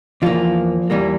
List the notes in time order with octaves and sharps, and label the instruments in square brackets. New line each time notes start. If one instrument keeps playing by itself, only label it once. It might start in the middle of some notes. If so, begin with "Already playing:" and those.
[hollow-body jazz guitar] E2 E3 F3 A#3 F4
E2 E3 G3 A#3